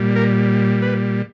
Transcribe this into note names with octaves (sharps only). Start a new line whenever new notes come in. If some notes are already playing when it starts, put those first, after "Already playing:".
Already playing: A#2 G3
A#4
B4